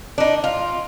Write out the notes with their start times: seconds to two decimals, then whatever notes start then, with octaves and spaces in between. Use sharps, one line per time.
0.18 D4 D#4
0.44 F4